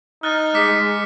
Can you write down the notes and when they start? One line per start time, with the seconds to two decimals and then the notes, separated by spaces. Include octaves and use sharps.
0.23 D#4 F6 F#6 A6
0.54 G#3 D6 B6 C#7